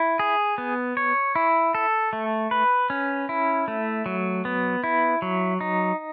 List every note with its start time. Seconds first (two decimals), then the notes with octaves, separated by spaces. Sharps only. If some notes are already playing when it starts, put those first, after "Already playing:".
Already playing: E4
0.19 G#4
0.58 B3
0.97 C#5
1.36 E4
1.75 A4
2.13 A3
2.51 B4
2.90 C#4
3.29 E4
3.68 A3
4.06 F#3
4.45 B3
4.84 E4
5.22 F#3
5.61 D#4